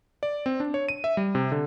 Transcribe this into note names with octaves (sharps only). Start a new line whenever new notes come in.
D5
C4
D4
C#5
D#7
E5
G3
C3
D3